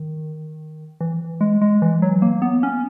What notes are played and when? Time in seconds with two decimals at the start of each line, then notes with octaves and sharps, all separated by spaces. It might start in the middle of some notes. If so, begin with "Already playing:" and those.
Already playing: D#3
1.01 E3
1.41 G#3
1.62 G#3
1.82 E3
2.02 F#3
2.22 A#3
2.42 B3
2.63 C#4